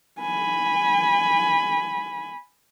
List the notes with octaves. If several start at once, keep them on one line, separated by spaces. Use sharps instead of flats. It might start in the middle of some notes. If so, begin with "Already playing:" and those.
G#5 B5